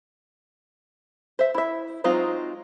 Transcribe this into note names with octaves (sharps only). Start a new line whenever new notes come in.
C5 E5
E4 E5
F#3 G#3 C4 D#4 F4